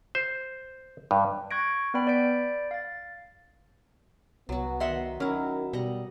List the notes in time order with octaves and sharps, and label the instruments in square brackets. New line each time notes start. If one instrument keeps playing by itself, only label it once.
[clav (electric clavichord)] C5
G2
[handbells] C#6 F#6 G#6 A#6 D7
B3 B4 D5 G5 B5 D7
D5 B5 G6 B6 D7
F5 A6
[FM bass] C2 [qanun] F#3 F#4 [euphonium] B3
[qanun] D#3 C6 [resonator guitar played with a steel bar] D#5 E5 F#5
[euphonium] D#3 [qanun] F#3 [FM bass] C#4 [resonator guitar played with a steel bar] E4 A#4
[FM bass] B2 [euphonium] G3 [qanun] D#5 F#5 A#5